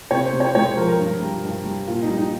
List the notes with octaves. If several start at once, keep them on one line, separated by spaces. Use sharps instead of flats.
C3 C#5
C5
C3
C#5
G#3 C#5
C5
F3 A#4
A#4
G2
G3
G2
G3
A#2 F4
D#4
G3
D#4